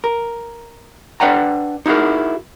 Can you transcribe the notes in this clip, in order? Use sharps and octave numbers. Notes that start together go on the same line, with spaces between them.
A#4
D4 B4 D5 F#5 G5 A#5
D#4 E4 F#4 G#4 A#4